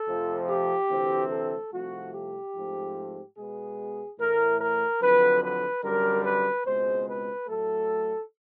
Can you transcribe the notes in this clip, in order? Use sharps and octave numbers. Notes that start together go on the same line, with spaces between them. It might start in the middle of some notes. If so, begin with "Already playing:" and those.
Already playing: A4
F2 C3 F3 A3 C4
G4
D2 C3 E3 A3 C4
A4
C2 C3 F3 A3 F#4
G4
G#2 F3 A3 C4
B2 G#3 B3 G#4
A2 E3 A3 A#4
A#4
F2 D3 F#3 B4
B4
F#2 D3 G3 A#4
B4
C#2 B2 G#3 C4 C5
B4
A2 F#3 A3 A4